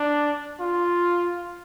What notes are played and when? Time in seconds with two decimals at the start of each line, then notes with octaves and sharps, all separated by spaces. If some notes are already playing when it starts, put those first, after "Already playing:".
Already playing: D4
0.60 F4